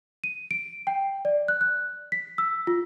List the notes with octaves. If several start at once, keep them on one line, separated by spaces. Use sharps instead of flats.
D#7
D7
G5
D5
F#6
F#6
B6
E6
F4